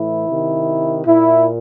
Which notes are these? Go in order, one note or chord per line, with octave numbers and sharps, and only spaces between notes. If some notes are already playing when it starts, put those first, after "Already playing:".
Already playing: A2 E3 E4
C3 D#3
A#2 E4